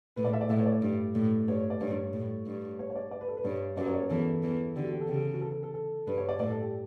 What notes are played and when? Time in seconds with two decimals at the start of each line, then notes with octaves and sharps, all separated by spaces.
0.16 A2 B4
0.25 D5
0.33 E5
0.41 D5
0.49 A2 E5
0.59 C#5
0.66 D5
0.82 G2
1.15 A2
1.48 G2 C#5
1.70 D5
1.81 G2 C#5
2.13 A2
2.46 G2
2.79 C#5
2.90 C#5
2.96 D5
3.11 D5
3.21 B4
3.28 A4
3.37 B4
3.45 G2 C#5
3.77 F#2 F#3 D5
3.86 C#5
3.93 D5
4.02 C#5
4.10 E2 E3 A4
4.43 E2 E3
4.76 D3 G4
4.84 F#4
4.93 G4
5.01 A4
5.08 C#3 G4
5.17 A4
5.34 F#4
5.41 A4
5.52 A4
5.63 A4
5.74 A4
6.07 G2 B4
6.18 C#5
6.29 D5
6.39 A2 D5
6.51 A4
6.62 G4